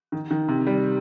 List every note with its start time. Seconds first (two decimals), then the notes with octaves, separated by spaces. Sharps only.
0.12 D#3
0.31 D#3
0.48 C3
0.67 G3